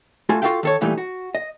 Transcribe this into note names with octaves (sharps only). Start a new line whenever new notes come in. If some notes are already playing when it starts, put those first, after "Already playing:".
A3 F4 F#4 A4 G#5
F4 F#4 A4 E5 F5 G5
D#3 A4 C#5
A#2 E3 G3 A3 D#4
F#4
D#5